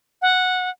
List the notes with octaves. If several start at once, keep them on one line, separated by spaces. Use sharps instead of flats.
F#5